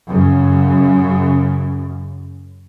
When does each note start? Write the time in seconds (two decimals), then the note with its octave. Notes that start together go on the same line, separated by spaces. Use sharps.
0.10 F#2 C#3